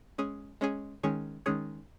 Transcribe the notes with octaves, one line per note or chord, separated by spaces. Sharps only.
G#3 C#4 G#4
G#3 C#4 G#4
D#3 G#3 C#4 G#4 C#5
D#3 G#3 C#4 G#4 C#5